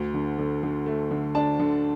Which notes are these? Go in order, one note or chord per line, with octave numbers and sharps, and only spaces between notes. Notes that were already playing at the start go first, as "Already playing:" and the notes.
Already playing: D2
D3
D3
D3
A3
D3
D4 A5
D3